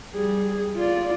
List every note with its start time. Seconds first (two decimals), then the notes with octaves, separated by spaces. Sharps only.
0.15 G3 G#4
0.77 F4 D5